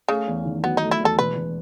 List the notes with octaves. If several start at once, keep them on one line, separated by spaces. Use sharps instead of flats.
C#3 A3
E2
D#3
F#3 B3
D#4
A3
E4
E2
A4
E1 B4
E1